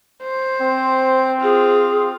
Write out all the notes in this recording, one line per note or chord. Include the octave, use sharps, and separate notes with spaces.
C5
C4
F4 G#4